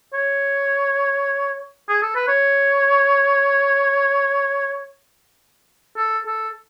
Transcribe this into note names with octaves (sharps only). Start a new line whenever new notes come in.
C#5
G#4
A4
B4
C#5
A4
A4